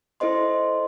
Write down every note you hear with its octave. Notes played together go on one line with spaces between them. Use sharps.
E4 A4 C5 D#5 C6